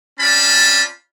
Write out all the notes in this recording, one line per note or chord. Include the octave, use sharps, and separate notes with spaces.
C4 C#4 F4 D5 A5 B5